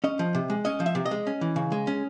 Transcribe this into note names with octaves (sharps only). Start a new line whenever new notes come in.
C#4 D#5
F3
C3
G#3
C#4 D#5
F3
E5
C3
D#5
G#3
C#4
E3
C#3
G#3
C#4